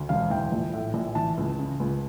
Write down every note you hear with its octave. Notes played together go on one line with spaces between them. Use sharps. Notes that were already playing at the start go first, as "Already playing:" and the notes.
Already playing: D2
E1 F5
E3 G5
A#1
A2
A#1
E3 A5
C#2
C#3
C#2